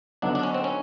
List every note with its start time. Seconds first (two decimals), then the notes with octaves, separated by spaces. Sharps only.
0.22 D3 F#3 B3 D4 D#4
0.35 D4
0.43 C#4
0.54 C4
0.64 C#4